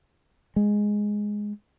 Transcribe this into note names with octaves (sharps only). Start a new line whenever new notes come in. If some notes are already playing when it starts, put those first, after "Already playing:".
G#3